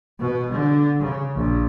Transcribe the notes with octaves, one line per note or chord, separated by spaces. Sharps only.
B2
D3
C#3
A#1